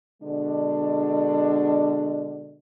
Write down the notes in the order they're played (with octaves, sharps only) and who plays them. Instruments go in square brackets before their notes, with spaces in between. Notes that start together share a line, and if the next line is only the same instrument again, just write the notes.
[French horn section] B2 D3 G#3 D4